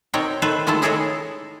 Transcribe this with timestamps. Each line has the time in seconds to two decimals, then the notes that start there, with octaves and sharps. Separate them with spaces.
0.14 B2 C4 D#4 A#4 C#5 G5
0.42 D#3 A4 B4 C5 E5
0.67 D#3 G#3 A3 E4 F4 A4
0.82 D#4 E4 G#4 A4 C#5 D#5